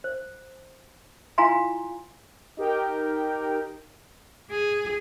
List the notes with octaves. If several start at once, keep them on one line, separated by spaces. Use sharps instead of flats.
C5
E4 F4 F5 G#5 A#5 C6
D#4 G4 A#4 G5
G#4